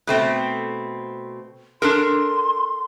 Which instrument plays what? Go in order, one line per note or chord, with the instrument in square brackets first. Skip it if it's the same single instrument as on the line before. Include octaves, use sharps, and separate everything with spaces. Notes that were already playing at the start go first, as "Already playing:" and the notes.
[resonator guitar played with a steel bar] B2 A3 C4
[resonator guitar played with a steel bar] D4 A4 A#4 [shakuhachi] C6